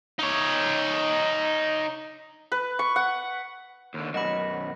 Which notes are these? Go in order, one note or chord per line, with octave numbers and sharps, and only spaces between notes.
D#4 C#5
B4
C#6
F#5
D#2 D3
B1 F#2 D#5 F#5 B5